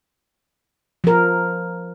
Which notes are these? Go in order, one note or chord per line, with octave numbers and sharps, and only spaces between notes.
F3 A#4